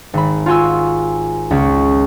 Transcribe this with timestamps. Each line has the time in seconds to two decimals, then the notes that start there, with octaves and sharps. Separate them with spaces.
0.14 G#1 B5
0.46 F4 F#4 G#5 C6 E6
1.51 C#2 C#4